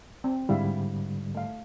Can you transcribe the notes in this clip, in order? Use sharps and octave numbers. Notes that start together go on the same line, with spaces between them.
C4
G#2 D3 G3 E4 E5 F5
A3 F5